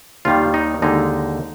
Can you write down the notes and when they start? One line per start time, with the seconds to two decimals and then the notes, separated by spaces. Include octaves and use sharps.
0.25 D#2 D#3 G3 F4
0.54 D#4
0.82 D#2 D3 G#3 D#4